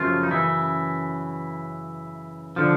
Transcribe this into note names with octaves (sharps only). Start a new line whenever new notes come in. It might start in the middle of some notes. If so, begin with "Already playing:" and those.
Already playing: F#2 C#3 F3 A3 F4
D#4
E3 E4
D3 F3